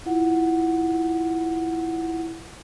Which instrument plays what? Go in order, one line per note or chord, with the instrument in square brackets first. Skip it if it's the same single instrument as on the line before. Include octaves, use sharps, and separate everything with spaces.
[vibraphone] E4 F4 F#5